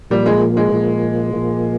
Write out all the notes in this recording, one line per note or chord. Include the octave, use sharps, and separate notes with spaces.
A#2 F3 G3 A#3
G#3
G#3
A#2 F3 A#3
A#2 F3 A#3